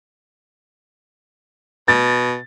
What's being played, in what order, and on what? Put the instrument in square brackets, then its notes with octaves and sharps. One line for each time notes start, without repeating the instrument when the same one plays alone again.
[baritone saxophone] B2 [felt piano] A6